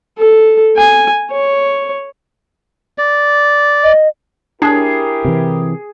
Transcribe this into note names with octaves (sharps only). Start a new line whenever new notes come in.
A4
G#5
C#5
D5
D#5
D4 E4 G4 G#4 A#4
C3 E3